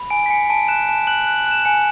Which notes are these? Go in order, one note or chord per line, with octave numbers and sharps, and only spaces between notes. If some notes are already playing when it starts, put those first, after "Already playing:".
Already playing: B5
G#5 D7
B6
G#5 C#7
A5 D7
F#6 E7
A5 E7
F#6 F#7
F#6 F#7
F#7
F#6 E7
G#5 C#7